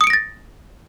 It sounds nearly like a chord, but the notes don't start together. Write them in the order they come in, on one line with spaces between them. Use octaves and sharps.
D#6 C#7 D7 A#6 A6